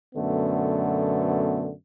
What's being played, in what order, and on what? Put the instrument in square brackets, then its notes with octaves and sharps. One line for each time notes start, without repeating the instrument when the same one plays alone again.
[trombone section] F#2 B2 D3 A3 B3